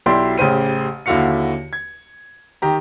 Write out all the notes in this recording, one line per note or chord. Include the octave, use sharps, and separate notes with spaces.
B1 F#3 E4 G4 D5 C6
A1 C#3 G4 C5 D#7
D#2 D3 E4 F#4 F5 C#7
G#6
D#3 G4 A#5